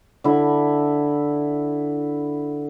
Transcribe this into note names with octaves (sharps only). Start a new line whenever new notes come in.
D3 E4